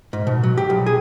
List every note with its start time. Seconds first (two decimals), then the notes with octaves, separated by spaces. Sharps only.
0.13 G#2
0.27 B2
0.43 F#3
0.57 G4
0.70 B1
0.86 G#4